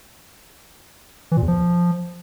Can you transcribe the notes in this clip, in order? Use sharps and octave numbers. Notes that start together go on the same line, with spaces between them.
E3
A#2
E2
F3